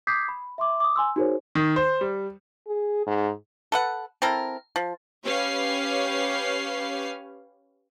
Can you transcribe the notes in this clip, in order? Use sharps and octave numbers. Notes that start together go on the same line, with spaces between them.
D6 D#6 G6 G#6 B6 C7
B5
E5 C6 D6
D6 D#6
G#5 C6 E6
D#4 F#4 G#4 A#4 C5 C#5
D#3
C5
G3
G#4
G#2
A4 B4 F#5
C4 E4 A4 A#4
F3
C#4 G4 B4 C#5 F5 C7